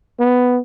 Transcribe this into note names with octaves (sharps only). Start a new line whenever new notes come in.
B3